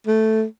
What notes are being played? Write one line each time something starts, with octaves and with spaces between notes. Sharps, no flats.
A3